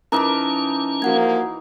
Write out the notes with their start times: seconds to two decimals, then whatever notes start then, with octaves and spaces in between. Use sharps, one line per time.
0.12 E3 C#4 D#4 A#4 A5 A#5 D6
1.02 F3 A#3 F#4 F#5 G#6